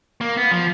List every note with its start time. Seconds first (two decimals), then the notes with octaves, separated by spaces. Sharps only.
0.21 A#3
0.37 B3
0.51 F3